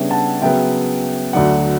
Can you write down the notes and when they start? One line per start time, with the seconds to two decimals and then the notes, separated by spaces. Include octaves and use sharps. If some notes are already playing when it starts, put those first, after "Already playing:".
Already playing: C#3 G3 B3 D4 C#5 E5 G5
0.10 F#5 A5
0.42 C#3 F#3 B3 E5 G5
1.33 D2 D3 F#3 D5 F#5